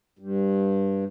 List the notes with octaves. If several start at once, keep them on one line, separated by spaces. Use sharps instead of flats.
G2